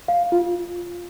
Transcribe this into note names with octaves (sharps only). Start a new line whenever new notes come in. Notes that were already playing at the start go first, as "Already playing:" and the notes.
F5
F4